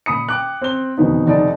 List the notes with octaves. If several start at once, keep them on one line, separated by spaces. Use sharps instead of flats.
A#2 B5 D#6 C#7
G5 D6 F#6
C4 G7
E1 F2 D#3 B3 D#4
F1 D#4 D5 A5